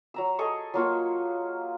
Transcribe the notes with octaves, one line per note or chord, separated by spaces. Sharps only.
F#3 A#5 E6
G#4 A4 D#5 C#6
F#3 A#3 F4 F#4